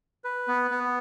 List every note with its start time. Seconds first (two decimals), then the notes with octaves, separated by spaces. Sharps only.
0.24 B4
0.48 B3
0.71 B3